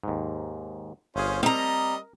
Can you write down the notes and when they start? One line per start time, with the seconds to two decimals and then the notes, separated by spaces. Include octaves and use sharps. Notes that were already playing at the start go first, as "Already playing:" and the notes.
0.03 D#2 G#2
1.16 G1 C#4 F4 G#4 C5
1.43 G3 C4 A#4 D#5 A#5